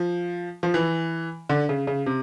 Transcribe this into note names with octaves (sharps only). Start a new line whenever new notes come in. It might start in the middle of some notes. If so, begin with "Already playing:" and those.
Already playing: F3
F3
E3
D3
C#3
C#3
C3